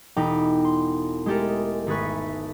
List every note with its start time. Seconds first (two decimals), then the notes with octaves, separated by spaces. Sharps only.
0.17 E1 D#4 G5 B5 D6
0.65 C6
1.26 G#3 A3 G4 A4 A#4
1.87 G#1 A3 G#4 B4 C#6